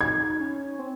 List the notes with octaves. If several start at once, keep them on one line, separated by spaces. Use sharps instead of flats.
D#4 G#6
C#4
C4